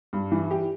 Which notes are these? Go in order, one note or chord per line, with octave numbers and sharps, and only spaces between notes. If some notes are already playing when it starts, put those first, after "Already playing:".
G2
E3
G4